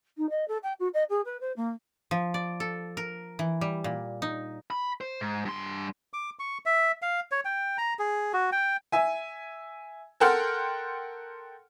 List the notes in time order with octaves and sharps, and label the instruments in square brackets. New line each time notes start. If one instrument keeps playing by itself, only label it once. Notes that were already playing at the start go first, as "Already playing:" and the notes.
[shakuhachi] D#4
D#5
A4
G5
F#4
D#5
G#4
B4
C5
A#3
[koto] F3
D5
A4
A#4
E3
G3
A#2
D#4
[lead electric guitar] B5
C5
G#2
G2 C6
[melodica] D6
C#6
E5
F5
C#5
G5
A#5
G#4
F#4
G5
[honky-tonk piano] E5 G#5
A4 A#4 F#5 G5 C6 F6